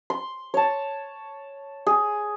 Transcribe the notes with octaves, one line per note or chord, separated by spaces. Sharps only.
C6
C#5 A5
G#4